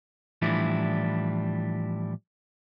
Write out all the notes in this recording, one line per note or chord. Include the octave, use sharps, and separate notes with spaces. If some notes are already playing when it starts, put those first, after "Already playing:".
A2 E3 F3 G3 D4 E4